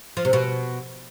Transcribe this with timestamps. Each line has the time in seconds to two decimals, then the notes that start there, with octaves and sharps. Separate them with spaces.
0.17 F3
0.25 C3
0.33 B2